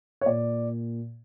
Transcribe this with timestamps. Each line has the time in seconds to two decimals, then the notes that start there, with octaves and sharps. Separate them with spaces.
0.21 C#5
0.26 A#2 D5